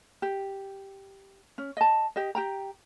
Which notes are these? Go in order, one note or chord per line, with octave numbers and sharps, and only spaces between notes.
G4
C#4
D#5 A5
G4 D#5
G4 G5 A#5